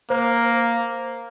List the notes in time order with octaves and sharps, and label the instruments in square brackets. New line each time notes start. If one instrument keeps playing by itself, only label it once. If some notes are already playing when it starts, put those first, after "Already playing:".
[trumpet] A#3 [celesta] C5